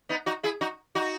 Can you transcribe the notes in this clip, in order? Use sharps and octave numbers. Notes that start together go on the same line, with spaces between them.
B3 D#4
D#4 F#4
E4 G#4
D#4 F#4
D#4 F#4